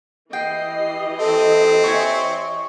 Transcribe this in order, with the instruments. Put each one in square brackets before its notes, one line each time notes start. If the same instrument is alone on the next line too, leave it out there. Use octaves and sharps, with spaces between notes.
[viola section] E3 G4 D#5 [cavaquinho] G5 [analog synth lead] C7
[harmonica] C4 [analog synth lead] A4
[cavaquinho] C#5 E5 G#5 [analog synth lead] C#6